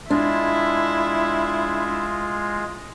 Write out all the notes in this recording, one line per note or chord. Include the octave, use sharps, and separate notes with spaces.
G#3 D4 E4 F4